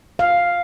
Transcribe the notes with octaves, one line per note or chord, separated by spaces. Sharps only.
F5